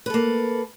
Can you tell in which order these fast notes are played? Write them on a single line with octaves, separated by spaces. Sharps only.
B4 A4 A#3